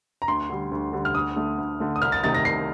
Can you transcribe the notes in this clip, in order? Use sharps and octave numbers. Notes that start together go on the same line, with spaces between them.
A#5
D2 C6
D3 G3
D2
D3 G3
F6
D2 D#6
D3 A3
D2
D3 A3
D#6
C2 F6
A6
C3 D#3 A3 A6
A#6
C2 C7